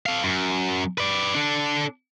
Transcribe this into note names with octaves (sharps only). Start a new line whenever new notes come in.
A4 F5
F#2
B4 D5
D4 A4